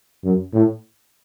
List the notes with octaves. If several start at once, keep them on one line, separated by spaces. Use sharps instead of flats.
F#2
A2